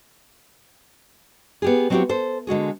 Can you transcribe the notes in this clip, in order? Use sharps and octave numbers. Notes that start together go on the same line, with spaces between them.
B3 G4 G#4
F#3 C4 D4 E4 F#4 G4
A4 C5
D3 G#3 F#4 G#4